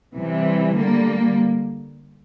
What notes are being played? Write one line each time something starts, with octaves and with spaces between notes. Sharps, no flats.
C3 E3 G3
D3 G3 A#3